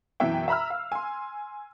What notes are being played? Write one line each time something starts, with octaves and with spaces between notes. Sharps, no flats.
F#2 B2 E3 E5 G5
E5 A#5 B5 E6 F6
F5
G#5 C6